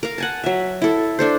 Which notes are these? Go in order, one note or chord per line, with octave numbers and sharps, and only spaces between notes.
A#4 F5
F#5 G#5 A5
F#3 E5
E4 A4
D4 A4 C5